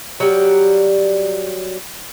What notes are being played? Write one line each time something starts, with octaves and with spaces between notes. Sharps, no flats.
F#3 G3